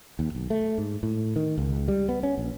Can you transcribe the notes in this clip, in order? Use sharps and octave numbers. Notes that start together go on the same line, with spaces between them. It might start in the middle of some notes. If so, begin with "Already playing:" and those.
D#2
B1
A3
G#2
A2
D#3
C#2
G3
B3
C#4
A#1